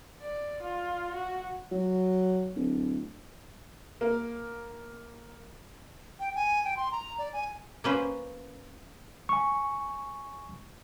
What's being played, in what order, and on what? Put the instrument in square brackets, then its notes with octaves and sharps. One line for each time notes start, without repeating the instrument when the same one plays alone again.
[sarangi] D5
F4
F#4
[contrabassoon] F#3
D1
[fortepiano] A#3
[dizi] G5
G#5
G5
C6
A#5
D5
G#5
[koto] A#3 C#4 B4 C5
[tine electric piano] G#5 C#6